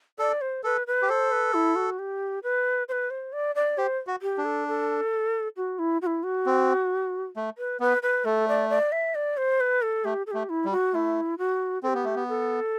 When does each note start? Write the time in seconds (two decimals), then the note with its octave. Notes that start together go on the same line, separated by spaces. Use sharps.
0.19 A4 D5
0.41 C5
0.64 A4 B4
0.87 B4
1.02 G4
1.09 A4 C5
1.32 B4
1.54 E4
1.76 F#4
1.99 G4
2.43 B4
2.88 C5
2.92 B4
3.10 C5
3.33 D5
3.55 D5
3.78 G4 C5
4.07 F#4
4.22 G4
4.38 D4
4.45 A4
4.68 A4
5.57 F#4
5.79 E4
6.02 F#4
6.06 E4
6.23 F#4
6.46 C4
7.36 A3
7.58 B4
7.80 B3 B4
8.03 B4
8.25 A3 A4
8.48 D5
8.70 D5
8.92 E5
9.15 D5
9.37 C5
9.60 B4
9.82 A4
10.05 A3 G4
10.27 A4
10.31 A3 G4
10.49 E4
10.65 G3
10.71 F#4
10.94 A3 E4
11.38 F#4
11.83 C4 A4
11.88 G4
11.95 B3
12.05 A3
12.16 B3
12.29 A4